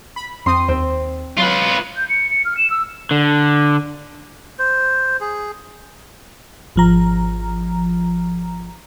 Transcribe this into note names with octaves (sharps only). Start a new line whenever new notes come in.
B5
F2 C4 C6 D#6
D#2 C4
F#3 F4 B4
G6
C#7
C#7
F6
E7
E6
D3
C5
G#4
G#1 F3 A#5